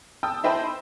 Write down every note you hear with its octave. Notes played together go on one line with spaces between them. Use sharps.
G5 A5 D#6 E6
E4 C5 D#5 G5 A5 B5